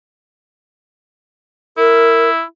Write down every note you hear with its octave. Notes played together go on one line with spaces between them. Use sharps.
E4 A#4